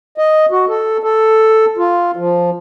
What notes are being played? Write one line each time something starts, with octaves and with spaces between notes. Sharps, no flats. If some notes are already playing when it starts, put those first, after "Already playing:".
D#5
F#4
A4
A4
F4
F3